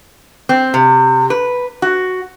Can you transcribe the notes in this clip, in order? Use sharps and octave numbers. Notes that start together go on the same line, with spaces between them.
C4
C3
B4
F#4